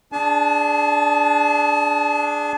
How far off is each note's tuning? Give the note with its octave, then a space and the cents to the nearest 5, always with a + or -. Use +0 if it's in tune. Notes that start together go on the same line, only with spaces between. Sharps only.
D4 +0 G#4 +0 A5 -40